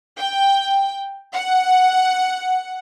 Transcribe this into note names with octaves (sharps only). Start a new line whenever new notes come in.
G5
F#5